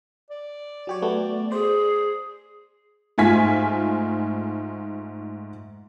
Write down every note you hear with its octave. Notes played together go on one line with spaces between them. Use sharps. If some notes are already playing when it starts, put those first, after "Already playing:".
D5
F#3 G4 C#5
A3 B3 F#4
G#4 C5
G#2 A3 F4 G#5 G#6 B6